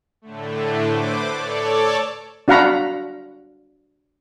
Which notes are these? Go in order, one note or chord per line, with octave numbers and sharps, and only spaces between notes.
A2 D3 A3
B4 C5 D6
A4 C#5 D5
D4 F#4 F5 F#5 A#5 B5